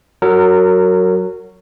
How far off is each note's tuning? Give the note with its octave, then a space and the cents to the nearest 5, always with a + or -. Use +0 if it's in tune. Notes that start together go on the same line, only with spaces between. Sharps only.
F#3 +0 A#4 -30